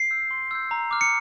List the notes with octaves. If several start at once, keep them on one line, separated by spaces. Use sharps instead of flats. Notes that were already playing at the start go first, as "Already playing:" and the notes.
Already playing: C7
E6 G6
C6
E6 G6
A#5
D6 F6
C#7